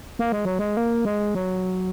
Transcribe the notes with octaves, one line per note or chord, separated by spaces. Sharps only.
A#3
G#3
F#3
G#3
A#3
G#3
F#3